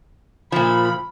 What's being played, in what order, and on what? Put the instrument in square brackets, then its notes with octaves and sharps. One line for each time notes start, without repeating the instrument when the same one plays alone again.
[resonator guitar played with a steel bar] A#2 F3 [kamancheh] B5